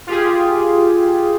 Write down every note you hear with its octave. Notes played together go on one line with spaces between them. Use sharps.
F4 G4 G#4